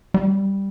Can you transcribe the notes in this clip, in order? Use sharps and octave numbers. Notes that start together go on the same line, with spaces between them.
G3